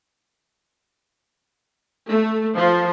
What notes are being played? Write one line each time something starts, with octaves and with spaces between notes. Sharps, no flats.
A3
F3